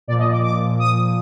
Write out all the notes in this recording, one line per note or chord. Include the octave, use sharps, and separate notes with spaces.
A#2 F3 D5
D#5
D6
D6
D#6